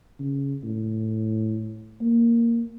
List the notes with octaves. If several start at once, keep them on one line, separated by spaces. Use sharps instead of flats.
C#3
A2
A#3